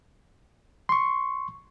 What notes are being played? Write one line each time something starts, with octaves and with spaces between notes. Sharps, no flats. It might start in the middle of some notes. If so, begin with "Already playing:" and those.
C6 C#6